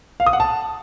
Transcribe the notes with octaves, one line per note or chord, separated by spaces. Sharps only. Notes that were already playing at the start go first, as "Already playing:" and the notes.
F5
D#6
F#5
A5